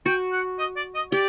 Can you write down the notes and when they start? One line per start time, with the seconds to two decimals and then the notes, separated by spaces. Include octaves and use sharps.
0.06 F#4 G5
0.32 F#5
0.59 D#5
0.76 D5
0.95 D#5
1.12 G4 D5